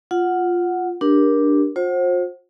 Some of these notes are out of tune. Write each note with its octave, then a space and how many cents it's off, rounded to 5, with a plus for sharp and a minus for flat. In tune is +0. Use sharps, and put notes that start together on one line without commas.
F4 +0 F#5 +0
D4 +0 G4 +5 A#4 +20
F4 +40 C5 +30 F#5 +10